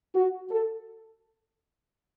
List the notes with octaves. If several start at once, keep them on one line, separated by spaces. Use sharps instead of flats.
F#4
A4